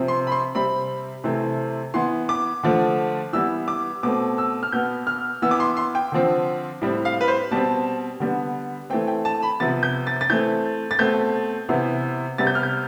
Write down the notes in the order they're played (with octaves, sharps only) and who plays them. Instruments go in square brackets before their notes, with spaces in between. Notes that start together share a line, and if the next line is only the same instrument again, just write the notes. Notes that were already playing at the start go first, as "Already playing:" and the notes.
Already playing: [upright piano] C3 F3 C4
C6
B5
C6
C3 G3 C4 B5
C3 E3 A3 C4
E3 B3 C6
D6
D3 F3 A3
E3 G3 B3 E6
D6
B2 A3 C4 D6
E6
F6
B2 B3 G6
F6
E3 B3 E6
D6
C6
C6
G5
D3 F3 C4
A2 G3 C4
F5
B4
C5
B2 G3 C4 A5
D3 G3 B3
E3 A3 C4 G5
G5
A5
B5
C3 F3 B3 A6
G6
A6
A6
E3 A3 C4 G6
A6
B2 A3 C4 G6
C3 E3 B3
C3 G3 B3 A6
G6
F6
G6